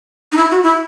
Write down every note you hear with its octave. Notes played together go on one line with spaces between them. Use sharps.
D#4
E4
F#4
E4